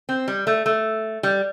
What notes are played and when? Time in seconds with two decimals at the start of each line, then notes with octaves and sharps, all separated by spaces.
0.09 C4
0.28 G3
0.47 A3
0.66 A3
1.23 G3